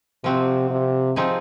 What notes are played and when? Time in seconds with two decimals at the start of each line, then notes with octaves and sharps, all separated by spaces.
0.24 C3 F3 C4 F#4
0.70 C3
1.16 F3 C4 D#4 G#4